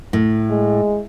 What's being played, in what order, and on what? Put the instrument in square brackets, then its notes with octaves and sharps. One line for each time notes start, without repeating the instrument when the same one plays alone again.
[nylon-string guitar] A2
[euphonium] G#3